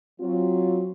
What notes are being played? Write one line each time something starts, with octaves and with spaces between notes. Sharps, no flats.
F#3 C4 F4